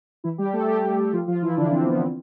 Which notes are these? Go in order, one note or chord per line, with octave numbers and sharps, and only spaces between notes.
E3 E4
G3 G4
A3 A4
G3 G4
F3 F4
F3 F4
E3 E4
D3 D4
C4
B3
C4